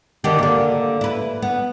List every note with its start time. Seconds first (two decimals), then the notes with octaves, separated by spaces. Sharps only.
0.24 D3 D#3 G4
0.39 D3 A#3
1.01 E4 B4
1.42 B3